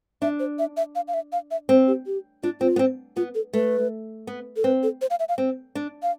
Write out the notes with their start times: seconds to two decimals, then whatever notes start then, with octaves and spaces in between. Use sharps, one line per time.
0.22 D4 E5
0.39 C5
0.59 E5
0.77 E5
0.95 F5
1.08 F5
1.14 E5
1.32 F5
1.51 E5
1.69 C4 C5
1.87 G4
2.06 G4
2.43 D4 F4
2.61 C4 F4
2.76 B3
2.79 C4
3.16 B3 F4
3.35 A4
3.53 A3 B4
4.27 B3
4.56 A4
4.64 C4 B4
4.83 A4
5.01 C5
5.10 F5
5.20 E5
5.29 F5
5.38 C4
5.75 D4
6.03 F5